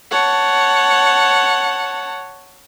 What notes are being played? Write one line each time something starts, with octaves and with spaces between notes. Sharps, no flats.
C#5 F#5 A5